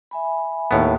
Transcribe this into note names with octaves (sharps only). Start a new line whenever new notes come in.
E5 G#5 B5
D#2 A2 B3